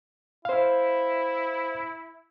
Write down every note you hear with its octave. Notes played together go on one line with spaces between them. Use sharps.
E4 C5 F5